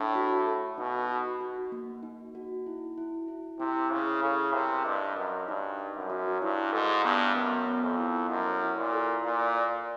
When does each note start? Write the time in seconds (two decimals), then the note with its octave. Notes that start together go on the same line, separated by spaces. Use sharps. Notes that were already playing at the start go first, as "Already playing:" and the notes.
Already playing: A2 D4
0.15 F#4
0.47 A4
0.78 B2 D#4
1.09 F#4
1.41 F#4
1.72 A#3
2.03 D#4
2.35 F#4
2.66 E4
2.98 E4
3.28 E4
3.59 C3 E4
3.91 C#3 E4
4.23 C#3 A4
4.54 C3 A#4
4.85 G2 D#5
5.16 F#2 D#5
5.48 G2 D#4
5.79 D#5
5.95 F#2
6.10 F#4
6.42 G2 E4
6.72 G#2 A4
7.05 G2 B3
7.35 F#2 B3
7.67 B3
7.82 F2
7.98 E4
8.29 F#2 F#5
8.61 E4
8.77 A#2
8.93 A4
9.23 A#2 D5
9.55 D5